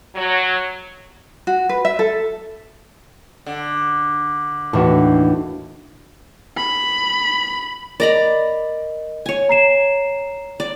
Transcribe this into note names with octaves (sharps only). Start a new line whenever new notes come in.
F#3
F#4
B4
E5
A4
D3
D#2 A2 E3 D4 F#4
B5
A#4 D5 D#5 A#5 B5
C#5 G#5
A#5 C7 E7
D5